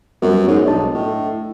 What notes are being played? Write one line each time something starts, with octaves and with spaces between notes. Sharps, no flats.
F#2 F#3 G3 B3
G#2 C#5
B1 D4 D#5 A5
A2